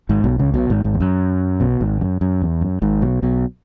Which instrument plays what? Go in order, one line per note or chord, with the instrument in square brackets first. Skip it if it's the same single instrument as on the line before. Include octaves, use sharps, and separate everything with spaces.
[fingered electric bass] G#1 G#2
B1 B2
C#2 C#3
B1 B2
G#1 G#2
G#1 G#2
E2
F#2
B1 B2
G#1 G#2
F#2
F#2
E2
F#2
G#1 G#2
B1 B2
B1 B2